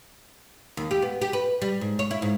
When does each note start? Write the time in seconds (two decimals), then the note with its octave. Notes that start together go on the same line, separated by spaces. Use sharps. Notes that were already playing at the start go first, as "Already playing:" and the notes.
0.77 D#2
0.91 G4
1.02 B3
1.22 G4
1.33 B4
1.62 G3
1.81 G#2
1.99 C#5
2.11 E4
2.22 G#2